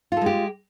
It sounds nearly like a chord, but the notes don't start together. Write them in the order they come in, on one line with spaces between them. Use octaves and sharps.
F4 A4 G#3 G4